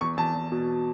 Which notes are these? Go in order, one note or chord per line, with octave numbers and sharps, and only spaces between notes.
E2 C#6
E2 A5
E2
B2